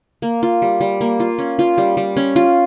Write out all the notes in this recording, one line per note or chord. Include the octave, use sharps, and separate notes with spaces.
A#3
F4
G3
G3
A#3
F4
C#4
F4
G3
G3
C#4
F4